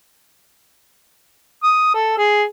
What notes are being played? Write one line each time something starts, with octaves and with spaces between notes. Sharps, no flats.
D#6
A4
G#4